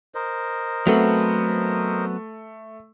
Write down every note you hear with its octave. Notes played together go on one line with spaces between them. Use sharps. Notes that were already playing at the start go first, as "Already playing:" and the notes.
A#4 C5 D#5
F#3 A3 B3 C4